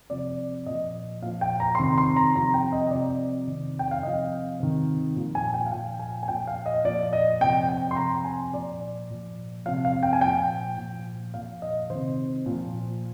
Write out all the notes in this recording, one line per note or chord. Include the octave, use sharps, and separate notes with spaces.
C3 F3 D5
A#2 F3 D#5
A#2 F3 F5
G5
A#5
C6
C3 D#3 A#5
C6
A#5
C3 F3 A#5
G5
D#5
D#5
C3 F3 D5
C3 D#3
G5
F5
C3 F3 D#5
C3 D#3
A#2 F3
G#5
G5
F5
A#2 F3 G5
G#5
G#5
A#2 F3 G5
F5
D#5
A#2 F3 D5
D#5
C3 F3 G5
G5
C6
C3 F3 A#5
G#5
A#2 F3 D5
A#2 F3
C3 F3 F5
F5
G5
G#5
A#2 F3 G5
A#2 F3
A#2 F3 F5
D#5
D#3 C5
C3
A#2 F3